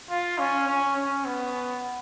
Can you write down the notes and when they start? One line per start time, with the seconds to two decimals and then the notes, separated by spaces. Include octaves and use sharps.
0.10 F4
0.38 C#4
0.67 C#4
0.96 C#4
1.25 B3